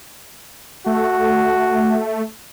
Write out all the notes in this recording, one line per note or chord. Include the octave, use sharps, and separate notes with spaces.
A3 F#4